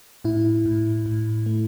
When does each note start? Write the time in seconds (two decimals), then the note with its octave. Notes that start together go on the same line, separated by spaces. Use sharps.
0.24 A2 E4
0.66 A2
1.06 A2
1.46 A3